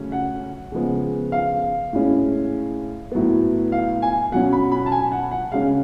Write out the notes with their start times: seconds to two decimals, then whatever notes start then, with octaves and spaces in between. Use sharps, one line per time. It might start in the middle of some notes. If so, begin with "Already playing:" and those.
Already playing: C#3 F#3 A3 C#4
0.12 F#5
0.72 C#3 F3 G#3 B3
1.32 F5
1.93 A2 G#3 C#4
3.12 A2 F#3 B3
3.72 F5
4.02 G#5
4.32 B2 F#3 C#4 F#5
4.53 B5
4.72 B5
4.86 A5
4.92 G#5
5.12 F#5
5.31 F#5
5.52 C#3 G#3 C#4 F5